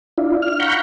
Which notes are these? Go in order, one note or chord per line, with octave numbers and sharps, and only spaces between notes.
D4 E4 F4
F6
F5 F#5 A#5 B5 C#6 G6